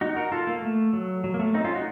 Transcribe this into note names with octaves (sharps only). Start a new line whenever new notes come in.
D#4 F#4
F#4 A#4
F4 A4
A#3
A3
F#3
F#3
A#3
A3
C4 D#4
C#4 F4
D#4 F#4